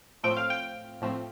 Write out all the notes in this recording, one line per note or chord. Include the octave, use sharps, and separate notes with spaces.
A2 F3 A3 C4 G5
F5
G5
A2 F3 A3 C4